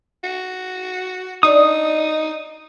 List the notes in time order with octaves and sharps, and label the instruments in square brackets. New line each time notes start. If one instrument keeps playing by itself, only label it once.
[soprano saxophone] F#4
[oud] D4 D5 [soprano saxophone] D#4 [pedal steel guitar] D#6